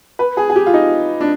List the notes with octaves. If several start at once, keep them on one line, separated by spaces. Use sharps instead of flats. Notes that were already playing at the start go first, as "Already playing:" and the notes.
B4
G#4
G#4
G4
F4
D#4
D4